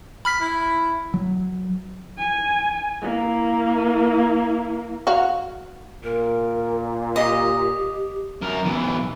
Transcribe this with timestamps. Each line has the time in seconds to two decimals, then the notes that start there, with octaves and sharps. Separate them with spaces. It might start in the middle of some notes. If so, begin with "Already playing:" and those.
0.25 B5 F6 B6
0.41 E4
1.14 F#3
2.18 G#5
3.02 A#3 E4
5.07 F#4 F5
6.03 A#2 A#4
7.16 G4 D#5
8.42 F#2 A#4
8.65 B1 E3